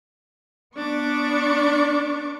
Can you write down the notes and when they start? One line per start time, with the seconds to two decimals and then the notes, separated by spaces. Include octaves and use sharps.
0.75 B3 D4 C#6 D6